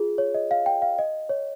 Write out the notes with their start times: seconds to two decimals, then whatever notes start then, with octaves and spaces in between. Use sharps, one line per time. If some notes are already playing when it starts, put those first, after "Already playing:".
Already playing: F4 G#4
0.18 C#5
0.34 D#5
0.51 F5
0.66 G5
0.82 F5
0.99 D#5
1.29 C#5